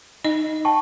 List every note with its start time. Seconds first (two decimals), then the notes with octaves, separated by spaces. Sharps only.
0.25 D#4 D#5
0.65 G5 A5 C#6